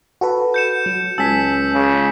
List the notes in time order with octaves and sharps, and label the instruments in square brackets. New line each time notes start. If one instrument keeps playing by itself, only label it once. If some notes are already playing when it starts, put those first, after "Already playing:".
[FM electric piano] F#4 A4 B4
[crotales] G6 C#7 E7
[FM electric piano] F#3
[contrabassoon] C#2 [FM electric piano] G#5 A5 [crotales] E6 B6
[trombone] C#3